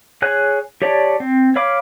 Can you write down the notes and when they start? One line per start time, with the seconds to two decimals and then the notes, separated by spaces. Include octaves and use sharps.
0.22 G#4 C#5 G#5 F#6
0.82 G4 C#5 D5 A5
1.20 C4
1.56 C#5 F5 B5 D6